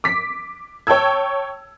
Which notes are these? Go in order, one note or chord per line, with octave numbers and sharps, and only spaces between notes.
D6 B6
C#5 G5 A5 E6 G#6